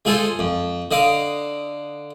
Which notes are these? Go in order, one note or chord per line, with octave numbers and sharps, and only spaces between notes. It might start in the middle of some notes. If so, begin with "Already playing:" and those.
G#3 F4 G#4 A4 C5
F2
D3 D#5 F5 D6